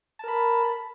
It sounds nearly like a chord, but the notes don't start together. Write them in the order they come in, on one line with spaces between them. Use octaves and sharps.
A5 A#4 B5